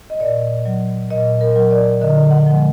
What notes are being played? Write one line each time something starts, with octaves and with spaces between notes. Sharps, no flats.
D#5
A#2 D5
F#3
A#2 D#5
A#4
F#3
D5
D3 D#5
F#5
F3 G#3